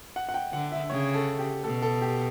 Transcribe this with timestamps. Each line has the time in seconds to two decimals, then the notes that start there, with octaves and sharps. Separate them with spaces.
0.16 F#5
0.29 F#5
0.34 G5
0.53 D3 F#5
0.72 E5
0.90 C#3 C#5
1.14 A4
1.39 G4
1.64 B2 A4
1.82 A4
2.01 G4